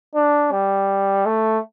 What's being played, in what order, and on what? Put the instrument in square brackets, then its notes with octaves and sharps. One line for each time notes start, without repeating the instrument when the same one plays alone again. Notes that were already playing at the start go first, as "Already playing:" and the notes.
[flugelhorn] D4
G3
A3